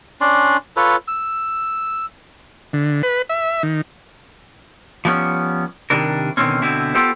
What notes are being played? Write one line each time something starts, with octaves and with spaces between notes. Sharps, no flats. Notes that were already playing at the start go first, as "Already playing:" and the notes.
C#4 D4 D5 C6
F4 A4 B4 C#5
E6
D3
B4
E5
D#3
F3 G3 B3 C#4
C3 D#3 G3 D4 A#4
B2 D3 D#3 G#3 C4 C#4
B2 D3 C4 E4
B3 F4 G4 A4 C5